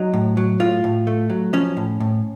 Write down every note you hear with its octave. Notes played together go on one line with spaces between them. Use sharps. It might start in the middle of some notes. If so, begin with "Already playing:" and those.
Already playing: F#3 D#4
A2
F#3
A2 F4
A2
A3
F#3
F3 C#4
A2
A2